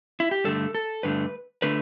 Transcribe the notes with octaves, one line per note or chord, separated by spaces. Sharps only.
E4
G4
G2 D3 A3 A4
A4
G2 D3 A3 B4
D3 A3 B4